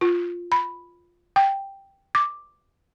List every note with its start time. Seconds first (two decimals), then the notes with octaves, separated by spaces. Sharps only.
0.01 F4
0.52 B5
1.36 G5
2.15 D6